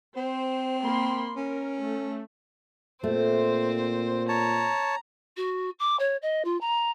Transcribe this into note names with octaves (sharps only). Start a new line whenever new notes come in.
C4 C5
A#3 B5 C6
C#4 A#4
A3
A#2 A3 C4 C5
C#5 A5 A#5
F#4
D6
C#5
D#5
F4
A#5